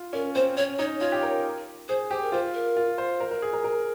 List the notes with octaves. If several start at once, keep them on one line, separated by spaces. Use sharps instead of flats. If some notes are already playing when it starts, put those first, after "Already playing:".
Already playing: F4
C#4 A#4
C4 C5
C#4 C#5
D#4 C#5
F4 C#5
G4
A#4
G#4 C5
G4 C5
A#4
F4 C5
A#4
F4
C5
A#4
A#4
G#4
A#4
A#4